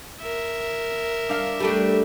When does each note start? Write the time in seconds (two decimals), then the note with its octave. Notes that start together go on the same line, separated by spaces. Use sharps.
0.20 A#4 E5
1.29 D4 F5
1.60 G3 A3 D4